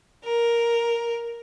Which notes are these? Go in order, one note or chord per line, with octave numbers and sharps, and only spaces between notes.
A#4